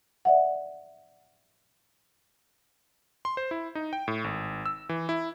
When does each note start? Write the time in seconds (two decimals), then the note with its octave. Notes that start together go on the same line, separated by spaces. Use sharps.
0.25 D5 E5 F#5
3.25 C6
3.37 C5
3.51 E4
3.75 D#4
3.93 G5
4.08 A2
4.24 G#1
4.66 E6
4.89 E3
5.09 E4